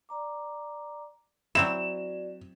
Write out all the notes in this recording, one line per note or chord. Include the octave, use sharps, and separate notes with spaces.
D5 A#5 D6
F#3 C4 E4 F#4 D5 E7